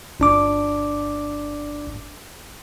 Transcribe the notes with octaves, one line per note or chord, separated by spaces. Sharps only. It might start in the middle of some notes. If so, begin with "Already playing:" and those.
G1 D4 D6